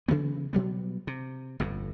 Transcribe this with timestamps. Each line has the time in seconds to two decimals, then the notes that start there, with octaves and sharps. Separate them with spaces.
0.08 C#3 E3 F#3 B3
0.53 B2 F#3 G3 B3
1.07 C3
1.60 G1 F2 A2